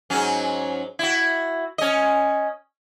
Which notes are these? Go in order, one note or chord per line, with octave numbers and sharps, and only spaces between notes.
G#2 F#3 C#4
E4 F#4
C#4 D#5